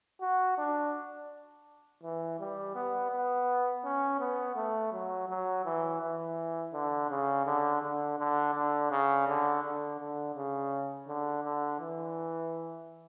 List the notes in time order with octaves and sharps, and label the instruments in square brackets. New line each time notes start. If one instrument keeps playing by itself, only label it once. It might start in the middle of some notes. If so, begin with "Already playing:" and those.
[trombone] F#4
D4
E3
G3
B3
B3
C#4
B3
A3
F#3
F#3
E3
E3
D3
C#3
D3
D3
D3
D3
C#3
D3
D3
D3
C#3
D3
D3
E3